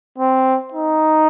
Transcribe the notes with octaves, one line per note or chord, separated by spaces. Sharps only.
C4
D#4